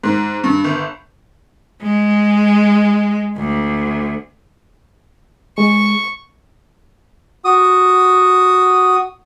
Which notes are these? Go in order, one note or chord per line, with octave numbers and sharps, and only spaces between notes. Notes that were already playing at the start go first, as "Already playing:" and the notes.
G#2
G2
G1
G#3
D2
G#3 C#6
F#4 D#6